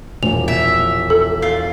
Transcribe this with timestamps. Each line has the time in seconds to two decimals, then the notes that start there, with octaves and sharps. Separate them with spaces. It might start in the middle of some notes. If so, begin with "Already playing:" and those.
0.23 E1 A#1 F7
0.48 E5
1.10 A4
1.42 F4